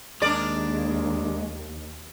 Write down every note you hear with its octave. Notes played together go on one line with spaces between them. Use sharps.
D#2 G#3 D4 A#4 D5